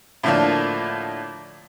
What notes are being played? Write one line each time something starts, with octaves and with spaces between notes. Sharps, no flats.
A2 D3 F3 A#3 D4